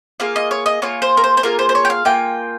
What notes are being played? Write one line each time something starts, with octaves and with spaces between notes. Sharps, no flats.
A#3 F4 G#4 F5
D#5
C#5
D#5
A#3 F4 G#4 C#5
C5
A#4
C5
C5
A#3 F4 G#4 A#4
C5
C5
C#5
G5
F5
A#3 F4 G#4 G5